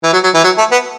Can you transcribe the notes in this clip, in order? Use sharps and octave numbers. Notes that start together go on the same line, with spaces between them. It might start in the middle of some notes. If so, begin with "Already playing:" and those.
E3
F#3
F#3
E3
F#3
A3
B3